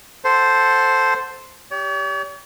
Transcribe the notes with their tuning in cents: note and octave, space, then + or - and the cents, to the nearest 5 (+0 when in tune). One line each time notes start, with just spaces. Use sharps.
A4 +0 C5 +0 F#5 +0
G4 +0 C#5 +45